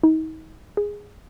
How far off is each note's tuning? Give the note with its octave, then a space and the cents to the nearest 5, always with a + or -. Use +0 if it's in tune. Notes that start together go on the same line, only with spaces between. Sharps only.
D#4 +35
G#4 -10